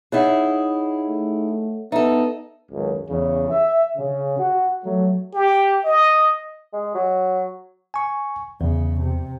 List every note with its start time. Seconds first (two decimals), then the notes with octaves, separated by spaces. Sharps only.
0.12 D#4 E4 G#4 C#5 D#5 F#5
1.09 A3
1.92 B3 D#4 A4 E5
2.72 G#1 C#2 F#2
3.09 E2 C#3
3.51 E5
3.97 C#3
4.39 F#4 F#5
4.85 F#3 A3
5.34 G4
5.84 D#5
6.73 G#3
6.94 F#3
7.94 G#5 C#6
8.61 E2 C#3
9.01 C3